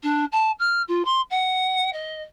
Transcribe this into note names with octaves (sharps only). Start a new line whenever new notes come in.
D4
A5
F6
F4
C6
F#5
D#5